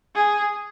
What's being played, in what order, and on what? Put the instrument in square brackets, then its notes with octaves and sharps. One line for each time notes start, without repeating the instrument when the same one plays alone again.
[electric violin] G#4